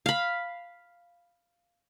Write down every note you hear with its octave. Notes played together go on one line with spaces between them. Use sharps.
F5 B5